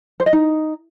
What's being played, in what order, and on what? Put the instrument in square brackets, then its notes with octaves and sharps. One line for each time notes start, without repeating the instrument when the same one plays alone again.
[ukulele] C5
D#5
D#4